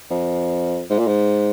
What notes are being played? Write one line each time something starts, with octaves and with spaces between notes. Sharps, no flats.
F2
G#2
A#2
G#2